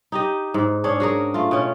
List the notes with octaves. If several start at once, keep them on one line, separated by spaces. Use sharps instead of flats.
D#4 G4 D#5
G#2
C#4 D4 G#4 C#5
F#4 G#4 A#4
A3 F4
B2 C#4